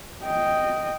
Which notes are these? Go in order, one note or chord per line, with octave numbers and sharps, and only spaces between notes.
D#5 G5